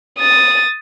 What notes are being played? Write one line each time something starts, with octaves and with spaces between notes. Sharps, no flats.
D#6 A6